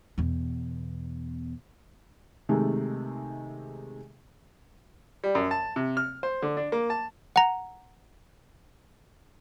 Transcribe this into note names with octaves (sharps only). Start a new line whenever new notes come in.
E2 B2
C3 D#3 G#3 A3
G3
F#2
A5
C3
F6
C5
D3
D4
A#3
A5
F#5 A#5